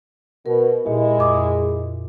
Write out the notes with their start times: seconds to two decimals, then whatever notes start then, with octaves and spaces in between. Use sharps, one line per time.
0.46 B2 A#4
0.86 A#2 G#3 E4 G4
1.18 F2 D6 D#6